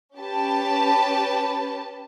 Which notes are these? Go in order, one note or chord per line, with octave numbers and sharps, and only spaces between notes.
C#4 G4 B4 A5